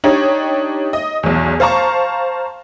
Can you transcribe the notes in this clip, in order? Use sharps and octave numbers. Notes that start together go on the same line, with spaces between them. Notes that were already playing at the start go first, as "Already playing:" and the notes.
D4 D#4 G4 C#5
D#5
B1 E2
C5 F5 A5 A#5 C#6